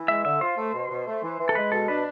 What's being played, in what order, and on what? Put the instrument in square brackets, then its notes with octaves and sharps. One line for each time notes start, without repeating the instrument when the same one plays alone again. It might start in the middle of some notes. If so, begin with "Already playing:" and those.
Already playing: [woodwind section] E3
[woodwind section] G#3 [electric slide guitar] E5
[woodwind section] D3 [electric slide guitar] E5
[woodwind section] F4 [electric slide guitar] C5
[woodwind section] A3
B2
B2
A3
E3
E3
[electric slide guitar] A4
[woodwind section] G#3 [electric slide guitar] B4
[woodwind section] B2 [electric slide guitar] A4
[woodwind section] D4 [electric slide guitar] B4